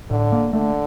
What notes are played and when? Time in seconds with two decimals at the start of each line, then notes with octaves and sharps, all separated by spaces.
0.10 A2 D3
0.32 A#3
0.53 D3 A3